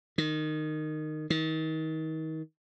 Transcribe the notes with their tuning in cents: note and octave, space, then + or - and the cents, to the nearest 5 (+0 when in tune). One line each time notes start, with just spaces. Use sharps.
D#3 -15
D#3 +30